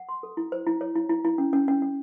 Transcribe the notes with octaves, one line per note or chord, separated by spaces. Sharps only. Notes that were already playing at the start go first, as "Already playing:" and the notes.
Already playing: F#5
C6
A4
E4
C5
E4
C#5
E4
E4
E4
C#4
C#4
C#4
C#4